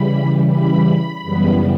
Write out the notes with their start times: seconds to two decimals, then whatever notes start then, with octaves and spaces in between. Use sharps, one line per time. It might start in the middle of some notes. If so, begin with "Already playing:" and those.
Already playing: C#3 E3 G3 B5
0.49 B5
1.23 F#2 C#3 E3 G3 B3